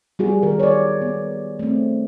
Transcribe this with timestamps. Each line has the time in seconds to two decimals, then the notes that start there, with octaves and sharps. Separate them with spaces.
0.19 G3 B3 F#4 G#4
0.43 D#3 A#4
0.60 C#5 D5
1.01 B3
1.59 A3 C4